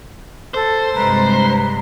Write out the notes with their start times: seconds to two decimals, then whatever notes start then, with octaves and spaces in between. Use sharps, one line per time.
0.54 A4 C5
0.95 G2 C3 G#3 B4 A#5